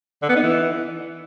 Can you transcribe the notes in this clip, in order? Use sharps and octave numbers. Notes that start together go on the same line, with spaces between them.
D3
B3
D#4
E3